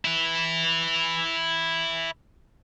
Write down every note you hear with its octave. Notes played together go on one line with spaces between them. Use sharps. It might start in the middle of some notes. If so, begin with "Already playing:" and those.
E4 B4